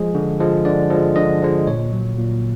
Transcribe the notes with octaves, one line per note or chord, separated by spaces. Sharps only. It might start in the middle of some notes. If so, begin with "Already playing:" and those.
Already playing: F3 G#3 G#4
D3
F3 G#3
D3 D5
F3 G#3
D3 D#5
F3 G#3
A#2 C#5
F#3
A#2